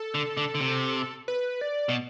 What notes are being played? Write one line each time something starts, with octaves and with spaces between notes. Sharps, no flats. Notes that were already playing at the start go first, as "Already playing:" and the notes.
Already playing: A4
D3
D3
D3
C3
B4
D5
B2